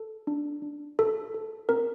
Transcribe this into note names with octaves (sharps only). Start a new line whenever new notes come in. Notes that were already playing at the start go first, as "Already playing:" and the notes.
Already playing: A4
D4
D4
A4
A4
C4 A#4